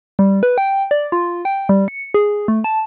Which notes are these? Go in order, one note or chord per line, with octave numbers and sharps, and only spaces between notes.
G3
B4
G5
D5
F4
G5
G3
C#7
G#4
A3
A5